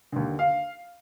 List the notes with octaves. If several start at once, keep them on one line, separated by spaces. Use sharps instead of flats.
D#2 D3
F5